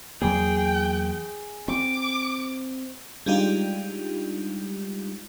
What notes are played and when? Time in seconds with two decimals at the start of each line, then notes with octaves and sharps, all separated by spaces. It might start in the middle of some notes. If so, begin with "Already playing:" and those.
0.22 E2 F#3 A#3 G#4 G5
1.68 C4 D6
3.26 G3 G#3 D4 D#4 F4 G4